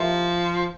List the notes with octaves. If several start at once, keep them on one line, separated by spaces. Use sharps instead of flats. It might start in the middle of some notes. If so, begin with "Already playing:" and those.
Already playing: F3 A#3 E4 G4 A#4 E5